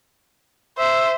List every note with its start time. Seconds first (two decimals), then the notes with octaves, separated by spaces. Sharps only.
0.78 C5 E5